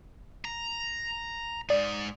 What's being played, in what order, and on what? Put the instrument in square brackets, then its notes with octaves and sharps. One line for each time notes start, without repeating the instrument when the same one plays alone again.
[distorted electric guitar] A#5
[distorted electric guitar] G#2 G#4 [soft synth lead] D5